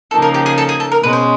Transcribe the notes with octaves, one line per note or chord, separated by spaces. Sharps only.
C#3 F3 A#3 D#4 A4
A#4
G4
G#4
A4
G#4
A4
A#4
B2 G#3 C#4 B4
C5